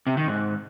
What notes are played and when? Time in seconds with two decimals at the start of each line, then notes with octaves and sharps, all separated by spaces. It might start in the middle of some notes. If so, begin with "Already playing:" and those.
0.07 C3
0.17 D#3
0.28 G#2